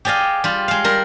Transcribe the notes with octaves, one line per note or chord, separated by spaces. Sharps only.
G4 G#4 D5 D#5 F5
G3 F4
G#3 F5
G3 A#4 C6